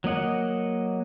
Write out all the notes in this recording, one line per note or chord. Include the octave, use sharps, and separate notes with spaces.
F#3 A#3 D#5 F#5